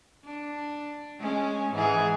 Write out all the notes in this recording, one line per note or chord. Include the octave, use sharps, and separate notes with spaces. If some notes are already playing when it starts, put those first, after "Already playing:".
D4
G#3 C#4
G#2 E3 G#4